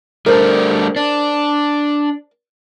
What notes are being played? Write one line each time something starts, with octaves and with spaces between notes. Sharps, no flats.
G3 A3 D4 A#4 C5 D5
D4